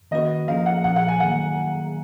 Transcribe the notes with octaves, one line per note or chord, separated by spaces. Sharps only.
D#3 A#3 C#4 F#4 B4 D#5
F3 A#3 C#4 F4 F5
F#5
B1 A#2 F3 F#5
F#5
G#5
D#3 F#3 A#3 F#5